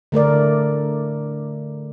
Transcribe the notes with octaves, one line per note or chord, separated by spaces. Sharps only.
D3 A3 A#4 D5